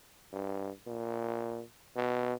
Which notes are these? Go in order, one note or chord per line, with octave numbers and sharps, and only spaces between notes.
G2
A#2
B2